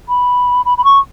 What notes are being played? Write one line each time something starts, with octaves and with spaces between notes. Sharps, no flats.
B5
B5
B5
C#6